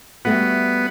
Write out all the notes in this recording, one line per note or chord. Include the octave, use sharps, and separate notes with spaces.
G3 A3 B3 F#4